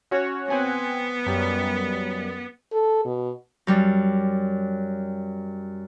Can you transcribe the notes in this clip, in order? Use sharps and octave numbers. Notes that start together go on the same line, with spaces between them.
C#4 F#4 C#5
B3 C4 F#5 G#5
F#2 G3
A4
B2
F#2 G3